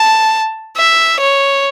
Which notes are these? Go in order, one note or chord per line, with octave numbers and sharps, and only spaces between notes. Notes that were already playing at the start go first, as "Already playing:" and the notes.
Already playing: A5
E5
C#5